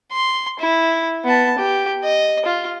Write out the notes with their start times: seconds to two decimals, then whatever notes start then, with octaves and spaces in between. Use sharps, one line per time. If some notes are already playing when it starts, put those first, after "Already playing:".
0.12 C6
0.59 E4
1.24 B3 A5
1.58 G4
2.03 D#5
2.46 F4